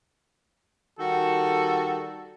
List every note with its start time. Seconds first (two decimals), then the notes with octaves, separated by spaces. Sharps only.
0.99 D#3 G3 F#4 A4